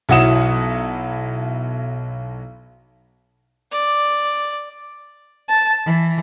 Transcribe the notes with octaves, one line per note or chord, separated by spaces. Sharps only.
B1 F#3 E4 F#5 D#6 E7
D5
A5
E3